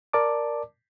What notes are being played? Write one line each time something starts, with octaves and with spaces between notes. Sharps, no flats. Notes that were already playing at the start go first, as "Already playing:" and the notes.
A#4 D5 A5 D6